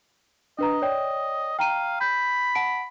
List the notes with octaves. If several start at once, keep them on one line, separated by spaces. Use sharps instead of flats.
D4 B4 D#5 A#5
C#5 D5 G5
F5 G5 A#5 D#7
B5 G6
F#5 A5 D7